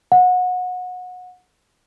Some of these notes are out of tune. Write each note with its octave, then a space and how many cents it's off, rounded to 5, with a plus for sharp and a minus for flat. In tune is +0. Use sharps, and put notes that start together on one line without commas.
F#5 -25